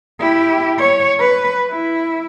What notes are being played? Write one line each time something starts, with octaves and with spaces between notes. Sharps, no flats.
E4 G4
C#5
B4
E4